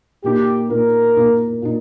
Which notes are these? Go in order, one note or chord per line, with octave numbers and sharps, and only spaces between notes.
A#2 A#3 D#4 G4
A#2 A#3 D#4 A#4
A#2 A#3 D#4
A#2 A#3 D#4